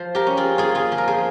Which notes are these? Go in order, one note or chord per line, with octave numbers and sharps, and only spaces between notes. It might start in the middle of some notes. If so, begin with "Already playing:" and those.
Already playing: F3 C5
G4 A#4
C#4
F4 G#4
A#3 F4 G#4
F4 G#4
F3
A#4
G#4 C5